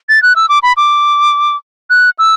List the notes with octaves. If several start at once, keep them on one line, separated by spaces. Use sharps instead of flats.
A6
F#6
E6
D6
B5
D6
F#6
E6